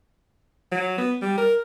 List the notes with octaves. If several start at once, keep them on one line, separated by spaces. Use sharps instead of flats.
F#3
B3
G3
A#4